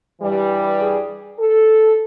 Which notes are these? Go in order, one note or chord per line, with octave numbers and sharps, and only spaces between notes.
G2 E3 G3
G#4
A4